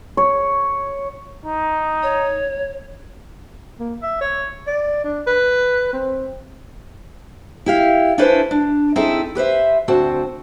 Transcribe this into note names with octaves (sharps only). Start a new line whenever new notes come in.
C#5
D#4
C#5
A#3
E5
C#5
D5
D4
B4
C4
E4 G4 F5
C#4 D4 E4 A4 B4 C5
D4
C4 D#4 E4 G#4 A4 E5
G4 B4 C5 E5
D2 C4 F#4 C5 A5